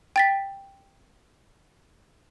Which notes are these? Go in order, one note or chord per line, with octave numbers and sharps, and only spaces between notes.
G5 A6 B6